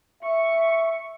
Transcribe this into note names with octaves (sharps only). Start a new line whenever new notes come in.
E5 C#6